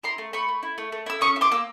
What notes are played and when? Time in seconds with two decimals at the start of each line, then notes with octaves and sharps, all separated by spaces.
0.03 E4 A#5 C6
0.18 A3
0.33 A3 B5 C#6
0.48 A3
0.63 E4
0.78 A3
0.92 A3
1.06 E4 E6
1.21 C#4 C#6 D#6
1.36 E4
1.41 C6 D6
1.52 A#3 E6